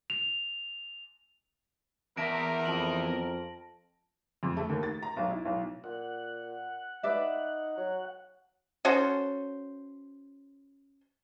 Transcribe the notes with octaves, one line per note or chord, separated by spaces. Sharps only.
F7
E2 A#4 E5 A5 A#6 D7
F2 A5 F#7
F2
A3
D#2
A6
A#5
B1
E4
B1
A#2 F#5
D#4 B4 D5 E5
F#3
C#4 F#4 A4 C5